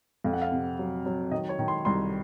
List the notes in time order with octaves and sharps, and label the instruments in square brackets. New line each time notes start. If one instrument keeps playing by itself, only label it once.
[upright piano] F2 F5
F#5
F5
C3
F#3
F#3
D#3 D#5
C#5
D#3
C6
C2 C6